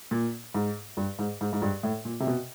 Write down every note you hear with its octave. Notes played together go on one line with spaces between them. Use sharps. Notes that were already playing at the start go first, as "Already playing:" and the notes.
A#2
G#2
G2
G#2
G#2
G#2
G2
A2
A#2
C3
B2